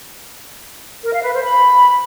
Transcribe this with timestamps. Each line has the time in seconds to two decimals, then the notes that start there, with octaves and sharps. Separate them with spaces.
1.03 A#4
1.13 F5
1.22 B4
1.32 C5
1.42 B5